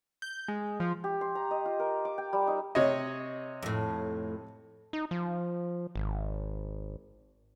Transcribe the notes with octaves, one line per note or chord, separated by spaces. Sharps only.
G6
G#3
F3
G4
C6
A#5
D#5
F4
A#4
D6
G5
G3
D#4
C3 C#5 D#5
F2 A2
D#4
F3
G#1